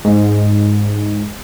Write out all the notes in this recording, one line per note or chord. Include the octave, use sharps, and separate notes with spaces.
G#2